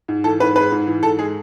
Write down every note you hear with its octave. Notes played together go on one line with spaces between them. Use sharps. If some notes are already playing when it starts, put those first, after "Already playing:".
G#2
E3 A4
G#2 B4
G#3 B4
G#2
E3
G#2 A4
G#3 G#4